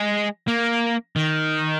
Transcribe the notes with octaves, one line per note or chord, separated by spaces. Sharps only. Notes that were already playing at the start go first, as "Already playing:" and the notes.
Already playing: G#3
A#3
D#3